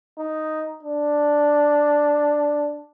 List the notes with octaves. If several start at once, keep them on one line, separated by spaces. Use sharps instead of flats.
D#4
D4